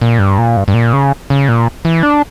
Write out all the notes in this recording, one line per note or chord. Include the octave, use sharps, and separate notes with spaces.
A#2
G2
A#2
G2
G2
A#2
C#3
C#3
A#2
E3
D4